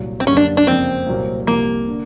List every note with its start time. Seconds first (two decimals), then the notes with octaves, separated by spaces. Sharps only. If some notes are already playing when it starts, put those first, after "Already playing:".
Already playing: C2 A#2 F#3
0.20 C4
0.27 F#2 D3 G3 A#3 C#4
0.37 D4
0.57 D4
0.67 F2 C#3 F3 A#3 C4
1.06 C2 A#2 F#3 A#3
1.47 C2 C3 F3 A#3
1.88 D3